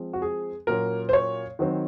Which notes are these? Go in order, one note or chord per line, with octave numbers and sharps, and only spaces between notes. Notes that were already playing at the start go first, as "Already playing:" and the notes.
Already playing: F3 G#3 C4
F#4
G#4
A#2 F#3 A#3 C#4 A#4
C5
C#5
D#3 F#3 C4